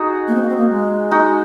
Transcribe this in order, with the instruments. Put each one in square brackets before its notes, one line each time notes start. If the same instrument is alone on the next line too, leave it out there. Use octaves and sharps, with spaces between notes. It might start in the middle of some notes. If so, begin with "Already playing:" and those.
Already playing: [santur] D#4 F#4 G#4
[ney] A#3
C4
A#3
C4
A#3
G#3
[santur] D#4 F#4